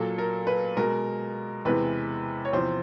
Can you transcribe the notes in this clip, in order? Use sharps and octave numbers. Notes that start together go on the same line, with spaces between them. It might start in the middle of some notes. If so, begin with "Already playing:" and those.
Already playing: A#2 F#3 A#3 A4
A#4
B4
B2 G#3 A#4
E2 C3 E3 G#3 B4
C#5
E2 C3 F3 C5